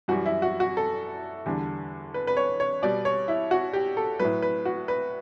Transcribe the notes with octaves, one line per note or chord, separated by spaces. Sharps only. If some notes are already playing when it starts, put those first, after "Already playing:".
F#2 E3 G3 F#4
E4
F#4
F#4
A4
E2 D3 G3
B4
B4
C#5
C#5
B2 G3 D5
C#5
E4
F#4
G4
A4
A2 F#3 B4
B4
F#4
B4